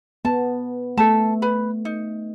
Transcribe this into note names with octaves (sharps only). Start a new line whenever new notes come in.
B3 A5
A3 A4 A5
B4 B5
D#4